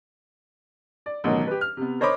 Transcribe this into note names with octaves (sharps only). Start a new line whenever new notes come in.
D5
A1 B2 D#3 F#3
G4 B4
F6
C3 B3
A#4 C5 C#5 D#5 B5 D6